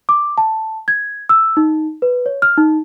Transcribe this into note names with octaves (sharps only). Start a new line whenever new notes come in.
D6
A5
G#6
E6
D#4
B4
C#5
F6
D#4